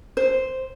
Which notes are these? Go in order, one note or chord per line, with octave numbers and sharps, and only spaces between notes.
C5